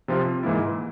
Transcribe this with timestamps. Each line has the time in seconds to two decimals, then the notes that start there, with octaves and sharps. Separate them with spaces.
0.08 C3 F3 C4 F4
0.43 G#2 E3 A#3 E4